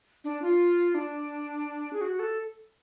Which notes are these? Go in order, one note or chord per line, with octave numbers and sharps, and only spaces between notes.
D4
F4
D4
G#4
F#4
A4